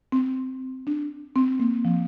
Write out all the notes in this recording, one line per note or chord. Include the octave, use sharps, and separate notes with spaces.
C4
D4
C4
A#3
F3